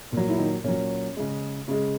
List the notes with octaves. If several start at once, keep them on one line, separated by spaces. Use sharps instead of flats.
A#2 F#3
E4
D#3 D#4
A#2 F#3 C#4
C#3 G#3
C#3 G#3